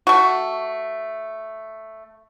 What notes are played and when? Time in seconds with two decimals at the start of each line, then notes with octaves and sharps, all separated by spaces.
0.07 A3 F#4